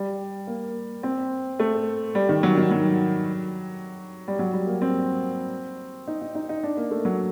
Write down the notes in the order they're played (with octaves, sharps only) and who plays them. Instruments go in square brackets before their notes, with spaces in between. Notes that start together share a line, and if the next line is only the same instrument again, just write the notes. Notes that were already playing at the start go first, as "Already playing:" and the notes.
Already playing: [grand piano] G3
A#3
C4
A3
G3
D#3
F#3
D#3
F#3
G3
F#3
G3
A#3
C4
D#4
D#4
D#4
D#4
D4
A#3
A3
F#3